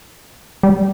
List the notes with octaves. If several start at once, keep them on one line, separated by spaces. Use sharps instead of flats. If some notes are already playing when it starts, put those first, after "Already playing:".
G3